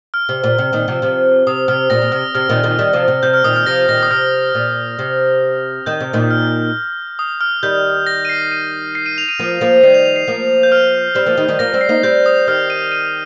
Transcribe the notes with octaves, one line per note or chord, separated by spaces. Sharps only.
F6
C3
A#2
C3
A#2 D#3
C3 F3
C3 F3
C3 D#6
C3 F6
A#2 A#6
A#2
C3 F6
C3 F6
A#2 D#3
A#2 D#3
D#3 G3
C3 F3
C3
C3 G6
F6
A#2 D#3 D#6
F6
C3 F3 A#6
A#2 D#3 A#6
D#6
C3 F6
A#2
C3
D#3 G6
C3
A#2 D#3
F6
D#6
F6
D#3 G3 G6
A#6
D#7
C7
D#7
C7
D#7
F7
D#7
F3 A#3 D#7
F3 A#3
D#3 G3 C7
F7
F7
C7
F3 A#3
G6
F6
G3 C4
F3 A#3
D#3 G3
D#3 G3
F3 A#3 A#6
G3 C4
C7
A#3 D#4
G3 C4 G6
D#6
D#3 G3 F6
D#7
D#7